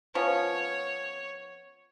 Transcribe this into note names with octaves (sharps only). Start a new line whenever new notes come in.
F3 B3 C#4 C#5